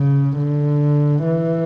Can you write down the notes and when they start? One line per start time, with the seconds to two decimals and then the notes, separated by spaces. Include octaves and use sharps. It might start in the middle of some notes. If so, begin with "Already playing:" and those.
Already playing: C#3
0.37 D3
1.25 E3